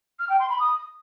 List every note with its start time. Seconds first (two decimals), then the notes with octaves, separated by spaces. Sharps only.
0.19 F6
0.29 G5
0.39 C6
0.49 B5
0.59 D#6